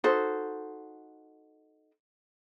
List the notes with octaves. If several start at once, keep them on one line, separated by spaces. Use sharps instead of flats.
D#4 F#4 A4 C5